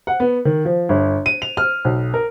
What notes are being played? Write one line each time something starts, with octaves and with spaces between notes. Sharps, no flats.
F#5
B3
D#3
F3
G1
D#7
F7
F6
B1
A#4